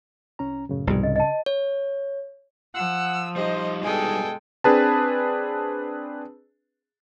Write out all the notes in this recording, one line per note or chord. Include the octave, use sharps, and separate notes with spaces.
C2 C#4 A#5
F#2 A2 C#3
C2 F2 G#2 B2 G3
C#3 D#5
D#5 A5
C#5
F3 F#5 E6
G3 D#4 C5 D#5
G2 B2 G#3 A4 G5 G#5
C4 D4 G#4 B4 A5